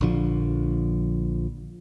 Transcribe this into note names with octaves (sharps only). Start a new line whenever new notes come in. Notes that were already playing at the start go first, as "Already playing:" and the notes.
A#1 D3 F3